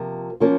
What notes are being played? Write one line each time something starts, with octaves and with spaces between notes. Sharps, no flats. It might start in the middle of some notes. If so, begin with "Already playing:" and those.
Already playing: C3 F3 A#3
F3 A#3 C#4 F4